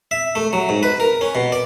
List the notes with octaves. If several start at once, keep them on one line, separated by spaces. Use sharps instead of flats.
E5
A3
F#3
G#2
B4
A#4
C#4
B2
D5